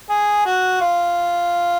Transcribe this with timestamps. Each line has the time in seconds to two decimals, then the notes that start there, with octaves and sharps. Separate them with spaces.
0.10 G#4
0.46 F#4
0.81 F4